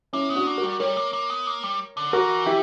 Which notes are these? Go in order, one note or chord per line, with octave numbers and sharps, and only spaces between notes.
A#3 C#4 E4
B3
D4 F#4
A#3
F#4 A#4
G3
G3 A#4 C#5
A#3
A#3
B3
A#3
G3
D3
E3 F#4 A#4
E4 G4